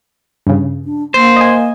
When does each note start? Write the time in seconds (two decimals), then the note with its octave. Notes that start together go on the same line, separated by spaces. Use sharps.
0.47 G2 C#3
0.85 D4
1.14 A#3 C5
1.36 D#5 G#5